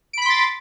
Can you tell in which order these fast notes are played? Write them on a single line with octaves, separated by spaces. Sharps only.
D7 B5 B6 C6 A6